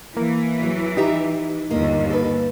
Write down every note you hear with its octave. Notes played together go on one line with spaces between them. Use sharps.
E3 A#3
E2 F#3
D#4 G4 E5 A#5
G1 D#2 A#3 D#5
A4 B4